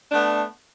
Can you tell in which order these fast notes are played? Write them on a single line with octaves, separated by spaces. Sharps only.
D4 A3 B3